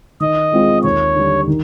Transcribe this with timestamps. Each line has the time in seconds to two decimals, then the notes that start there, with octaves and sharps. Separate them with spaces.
0.20 D#3 D#5
0.52 G#3 C4 F4 G#4
0.84 D#2 C#5
1.16 D3 G3
1.47 D#3